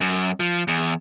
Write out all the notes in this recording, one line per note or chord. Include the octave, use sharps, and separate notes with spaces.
F#2
F3
E2